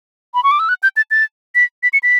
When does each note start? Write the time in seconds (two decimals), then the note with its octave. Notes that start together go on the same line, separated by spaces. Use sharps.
0.34 B5
0.43 C#6
0.51 D6
0.59 E6
0.69 F#6
0.83 G6
0.97 A6
1.11 A6
1.55 B6
1.83 B6
1.93 C#7
2.03 B6